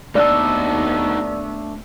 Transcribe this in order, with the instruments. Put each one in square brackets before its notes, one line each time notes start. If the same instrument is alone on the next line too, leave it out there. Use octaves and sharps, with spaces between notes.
[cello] D#2 B3 [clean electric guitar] A3 D4 A4 [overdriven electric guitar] D#4 F#4 [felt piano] D5